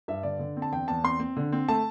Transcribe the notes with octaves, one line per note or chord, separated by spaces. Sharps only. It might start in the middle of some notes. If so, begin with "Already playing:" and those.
G2 E5
D3 D5
D3
C4
A5
E2 G5
E2 A5
C4 C6
C4
D3
C4
A3 A5